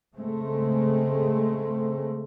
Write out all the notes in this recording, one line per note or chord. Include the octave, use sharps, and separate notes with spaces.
C#3 G#3 A3 C4